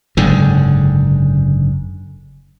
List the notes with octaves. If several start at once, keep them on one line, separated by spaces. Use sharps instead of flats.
F#1 G#2 D3